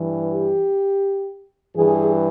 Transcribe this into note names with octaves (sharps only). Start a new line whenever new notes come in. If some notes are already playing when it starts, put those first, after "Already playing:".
Already playing: G2 E3
G4
G2 E3 G#4